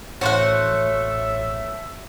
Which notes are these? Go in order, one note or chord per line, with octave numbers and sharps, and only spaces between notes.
A1 A3 F#4 C5 C#5 E5 F#5